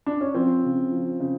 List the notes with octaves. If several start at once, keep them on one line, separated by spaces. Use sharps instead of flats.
D4
C#4
F3 C4
C#3
F3
C#3